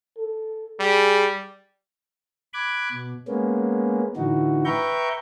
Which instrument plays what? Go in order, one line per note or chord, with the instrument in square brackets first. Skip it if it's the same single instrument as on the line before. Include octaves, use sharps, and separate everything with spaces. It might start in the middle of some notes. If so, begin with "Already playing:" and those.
[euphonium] A4
[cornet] G3 [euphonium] G#4
[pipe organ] B5 D6 F#6 G#6
B2
G#3 A#3 B3 C#4
A2 D3 E3 D#4 F#4
B4 E5 G5 A#5 C#6 G6